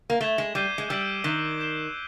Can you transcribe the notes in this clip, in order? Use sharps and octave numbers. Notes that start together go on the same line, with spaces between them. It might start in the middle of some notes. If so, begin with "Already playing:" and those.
A#3
A3 G#6 B6 E7 G7
G#3
G3 D6 G6 C7 D#7 G7
G#3
G3 E6 G6 B6 D7 F#7
D#3 F#6 B6 E7 G7
G6 C7 E7 G7